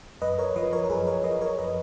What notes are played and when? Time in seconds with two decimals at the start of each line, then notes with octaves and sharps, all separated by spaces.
0.22 F#2 B4 D#5
0.38 A#4 C#5
0.56 F3 B4 D#5
0.73 A#4 C#5
0.84 A#4
0.90 F#2 G#4 B4
1.07 A#4 C#5
1.24 F3 B4 D#5
1.41 A#4 C#5
1.58 B4 D#5